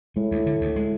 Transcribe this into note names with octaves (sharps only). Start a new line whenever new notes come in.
A2 G#3
D2
D3
D2
G#3